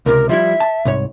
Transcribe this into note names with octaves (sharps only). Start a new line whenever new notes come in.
C#2 C3 A#4
F3 G3 E4 E5
A5
C2 G#2 C#5